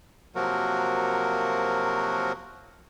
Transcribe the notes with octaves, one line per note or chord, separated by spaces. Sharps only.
C3 F3 F#3 A#3 F#4 A#4